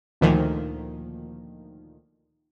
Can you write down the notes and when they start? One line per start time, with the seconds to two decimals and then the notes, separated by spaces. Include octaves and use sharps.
0.21 D2 A#2 D#3 F3